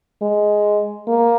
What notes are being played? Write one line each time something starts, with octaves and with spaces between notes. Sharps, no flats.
G#3
A#3